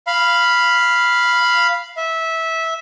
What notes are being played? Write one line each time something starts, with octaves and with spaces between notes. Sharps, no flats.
F5 B5
E5